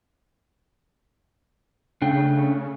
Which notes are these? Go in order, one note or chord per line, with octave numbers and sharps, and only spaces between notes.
C#3 A3 D4 G5